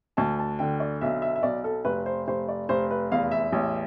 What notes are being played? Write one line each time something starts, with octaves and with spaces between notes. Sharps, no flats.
D2 A5
A5
D3 G5
D5
B1 E5
E5
E5
B1 D5
A4
F1 B4
C5
F1 C5
D5
F1 C5
B4
E2 F5
E5
A1